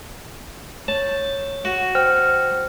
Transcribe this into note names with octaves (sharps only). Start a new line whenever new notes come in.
C#5 A5
F#4
C5 G5 F6